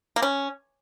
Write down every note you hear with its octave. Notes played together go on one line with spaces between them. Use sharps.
A#3
C#4